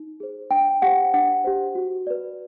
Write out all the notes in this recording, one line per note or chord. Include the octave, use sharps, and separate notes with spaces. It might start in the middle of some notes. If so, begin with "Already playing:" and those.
Already playing: D#4
G#4 C5
D4 G5
G4 C5 F#5
D4 F#5
G4 C5
F#4
B4 D5